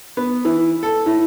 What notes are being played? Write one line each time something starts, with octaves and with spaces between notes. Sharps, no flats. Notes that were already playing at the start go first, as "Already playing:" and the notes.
B3
E3
A4
A2